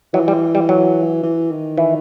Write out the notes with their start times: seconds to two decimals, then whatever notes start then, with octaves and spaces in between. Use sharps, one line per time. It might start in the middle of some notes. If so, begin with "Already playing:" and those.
0.14 E3 F#3
0.28 G3
0.55 G3
0.69 F#3
1.23 E3
1.51 D#3
1.77 E3